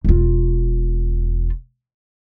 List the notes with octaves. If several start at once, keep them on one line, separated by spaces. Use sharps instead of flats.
E1 F4